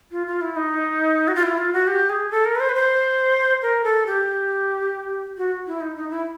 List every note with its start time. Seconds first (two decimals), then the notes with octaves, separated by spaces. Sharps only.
0.12 F4
0.27 F4
0.41 E4
0.56 D#4
1.28 F#4
1.35 F4
1.43 E4
1.58 F4
1.73 F#4
1.87 G4
2.09 G#4
2.31 A4
2.45 A#4
2.55 B4
2.60 C5
2.69 B4
2.75 C5
3.62 A#4
3.84 A4
4.06 G4
5.37 F#4
5.67 E4
5.81 D#4
5.96 D#4
6.10 E4